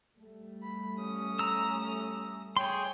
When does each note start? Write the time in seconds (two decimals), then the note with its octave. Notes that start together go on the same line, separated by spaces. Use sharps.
0.19 G3 A3
0.63 B5
0.98 C#4 D#6
1.39 A#5 E6
2.57 G#4 C#5 G5 C6